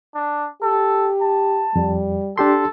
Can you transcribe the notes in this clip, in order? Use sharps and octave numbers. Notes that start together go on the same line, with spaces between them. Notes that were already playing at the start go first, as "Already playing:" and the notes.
D4
G4 A4
A5
F2 G3
D4 G4 A4 C6